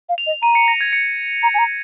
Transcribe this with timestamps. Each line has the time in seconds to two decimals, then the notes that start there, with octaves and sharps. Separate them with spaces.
0.09 F5
0.18 F7
0.27 D#5
0.42 A#5 D#7
0.55 C#7
0.68 A#6
0.81 G#6
0.93 C#7
1.43 A#5
1.54 G#5
1.59 A#5